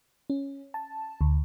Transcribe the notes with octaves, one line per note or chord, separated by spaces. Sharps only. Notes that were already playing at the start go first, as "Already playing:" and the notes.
C#4
A5
D2